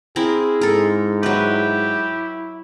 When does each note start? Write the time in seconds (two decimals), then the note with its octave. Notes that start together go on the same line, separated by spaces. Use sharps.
0.16 C4 E4 G#4 A#4
0.61 G#2 A4 A#4
1.23 F#3 E4 G4 B4